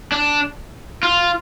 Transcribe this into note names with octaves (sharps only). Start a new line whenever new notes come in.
D4
F4